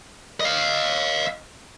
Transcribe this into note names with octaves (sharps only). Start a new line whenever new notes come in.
D#5 F5